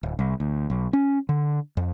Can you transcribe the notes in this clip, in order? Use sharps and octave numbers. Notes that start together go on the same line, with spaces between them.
D1
C2
D2
B1
C#4
D3
F2